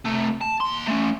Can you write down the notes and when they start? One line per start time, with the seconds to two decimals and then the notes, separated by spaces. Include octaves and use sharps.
0.06 C3 A3
0.41 A5
0.61 D#2 C6
0.88 A3 C#4